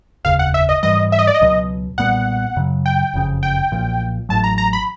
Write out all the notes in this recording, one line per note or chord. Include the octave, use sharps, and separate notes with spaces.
F1 D#2 C#3 F5
F#5
E5
D#5
G#2 E3 G3 D#5
E5
D#5
D5
D#5
C#2 B2 F#3
B1 A#2 G3 B3 F#5
F#2 C#3 F#3
G5
F#1 F2 C#3
G5
B1 A#2 F3
A1 A2 F#3 A5
A#5
A#5
B5